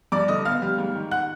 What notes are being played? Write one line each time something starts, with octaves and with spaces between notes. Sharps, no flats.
G2 D5 D6
D3 D#5 D#6
B3 F5 F6
G3
G#2
D#3
F#5 F#6